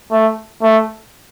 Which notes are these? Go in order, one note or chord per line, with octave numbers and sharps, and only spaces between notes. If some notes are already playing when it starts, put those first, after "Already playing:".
A3
A3